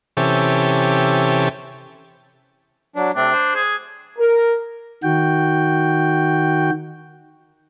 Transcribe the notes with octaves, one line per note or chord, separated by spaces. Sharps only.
C3 E3 C#4 G4 A4
F#3 D4
C3 A3 C4 D4
C5
G#4
A#4
D#3 F#4 G5